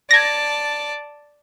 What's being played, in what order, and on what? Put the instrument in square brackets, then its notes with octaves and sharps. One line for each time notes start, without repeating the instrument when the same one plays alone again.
[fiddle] D5 A5 [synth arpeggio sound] G#6 A#6